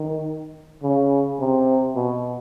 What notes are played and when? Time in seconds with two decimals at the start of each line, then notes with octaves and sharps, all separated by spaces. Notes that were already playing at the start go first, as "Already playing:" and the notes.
Already playing: D#3
0.82 C#3
1.40 C3
1.96 B2